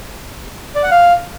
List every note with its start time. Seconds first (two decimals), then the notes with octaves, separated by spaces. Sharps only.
0.75 D5
0.83 F#5
0.91 F5